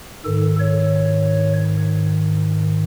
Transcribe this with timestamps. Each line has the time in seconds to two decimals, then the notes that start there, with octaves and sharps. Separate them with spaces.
0.25 G#2 D#3 A4
0.59 C#5